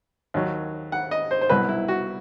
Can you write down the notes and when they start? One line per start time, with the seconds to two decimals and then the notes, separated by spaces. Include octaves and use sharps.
0.34 D#2 D#3 F#3
0.92 F#5
1.11 D#5
1.31 C5
1.41 C5
1.50 C2 B2 F#3 B4
1.69 E4
1.88 F#4